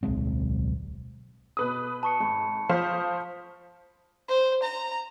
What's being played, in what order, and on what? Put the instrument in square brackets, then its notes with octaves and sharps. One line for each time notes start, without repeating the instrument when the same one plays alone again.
[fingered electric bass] D1 B1 G#3 C4
[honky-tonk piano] B2 B4 D#6
[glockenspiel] A5 C#6 C#7
[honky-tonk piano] G#1 [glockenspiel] A5 B5
[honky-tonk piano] F3 C5 F5 [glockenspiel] D#6 B6
[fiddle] C5
A#5